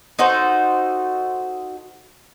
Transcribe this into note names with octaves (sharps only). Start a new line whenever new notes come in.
D#4 F#4 A4 C5